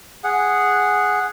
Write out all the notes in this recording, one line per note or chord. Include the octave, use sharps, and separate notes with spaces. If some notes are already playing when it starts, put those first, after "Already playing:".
G#4 F#5